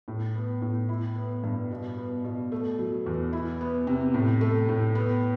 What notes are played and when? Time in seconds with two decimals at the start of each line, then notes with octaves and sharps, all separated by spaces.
0.08 A2
0.35 B3
0.62 A2
0.89 E4
1.16 B3
1.44 G2
1.71 B2
1.97 B3
2.24 B2
2.52 A3
2.79 F#3
3.06 E2
3.33 E4
3.61 B3
3.87 C3
4.14 A2
4.41 A3
4.69 A2
4.95 B3